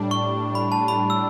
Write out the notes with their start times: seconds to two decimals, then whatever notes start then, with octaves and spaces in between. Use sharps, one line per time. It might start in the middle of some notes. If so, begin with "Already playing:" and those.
Already playing: A2 G3 D4
0.11 C#6
0.55 B5
0.72 A5
0.88 B5
1.10 E6